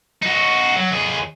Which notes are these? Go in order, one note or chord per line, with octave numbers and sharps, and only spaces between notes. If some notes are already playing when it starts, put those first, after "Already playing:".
D#4 F#4
F#3
D#2 G#4